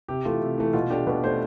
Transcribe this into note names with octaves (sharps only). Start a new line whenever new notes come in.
C3 G4
E3 A3 F4
C3
E3 A3
B2 F4
A3 D4 G4
B2 B4
A3 D4 C5